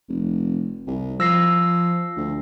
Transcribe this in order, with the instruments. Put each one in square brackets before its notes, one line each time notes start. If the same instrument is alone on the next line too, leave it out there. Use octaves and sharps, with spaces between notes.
[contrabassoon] F1
C2
[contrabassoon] F3 [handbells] E6 A#6 C7
[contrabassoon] D2